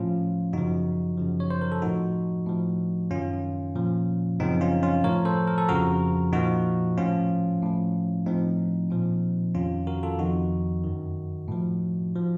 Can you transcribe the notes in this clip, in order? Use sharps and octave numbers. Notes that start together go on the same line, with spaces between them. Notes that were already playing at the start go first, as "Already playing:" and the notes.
Already playing: A2 F3 C#4 F4
F#2 C#3 F3 D#4 F#4
F#2 C#3 F3
C#5
C5
A#4
A4
A2 F3 D#4 F#4
A2 F3
F#2 D#3 C#4 F4
A#2 F3
F#2 C#3 F3 C4 D#4
C#4 F4
C#4 F4
A2 F3 A#4 C#5
A4 C5
A#4
A4
F2 C#3 F3 F#4 A#4
A#2 F3 D#4 F#4
A2 F3 C#4 F4
A2 F3
A2 F3 C4 D#4
A#2 F3
F2 C3 D#3 C#4 F4
F#4 A#4
F4 A4
F2 D#3 D#4 F#4
F#2 D#3
A2 F3
F3